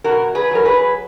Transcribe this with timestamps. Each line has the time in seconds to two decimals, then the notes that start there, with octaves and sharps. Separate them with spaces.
0.04 B2 F#4 A#4
0.28 E2
0.35 G#4 B4
0.51 F#3 A#4
0.65 G#4 B4
0.72 F#3